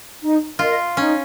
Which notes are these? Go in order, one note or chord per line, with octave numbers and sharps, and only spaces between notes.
D#4
F4 A#4 D#5
C#4 D#4